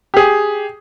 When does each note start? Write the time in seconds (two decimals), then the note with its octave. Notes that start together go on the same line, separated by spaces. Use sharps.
0.14 G4 G#4